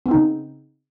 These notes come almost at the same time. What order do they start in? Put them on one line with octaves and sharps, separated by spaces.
B3 C4 D#4 C#3